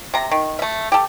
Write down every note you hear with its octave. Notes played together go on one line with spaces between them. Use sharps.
C3 A#5
D#3
A3 E5
G4 A4